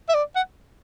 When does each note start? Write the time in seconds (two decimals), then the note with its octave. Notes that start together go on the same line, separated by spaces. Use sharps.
0.09 E5
0.14 D5
0.35 F#5